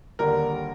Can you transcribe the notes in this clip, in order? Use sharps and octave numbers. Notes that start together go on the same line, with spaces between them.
D#2 D3 G3 A#4